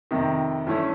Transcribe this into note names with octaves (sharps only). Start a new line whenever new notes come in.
F2 C3 D#3
G2 E3 A3 C#4 E4